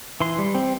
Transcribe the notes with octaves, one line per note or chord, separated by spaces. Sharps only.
E3 C6
G3
C4